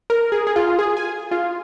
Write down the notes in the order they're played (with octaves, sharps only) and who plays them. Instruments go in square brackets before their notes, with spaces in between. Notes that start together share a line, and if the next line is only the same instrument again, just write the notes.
[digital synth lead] A#4
G#4
G#4
F4
G#4
G#5
F4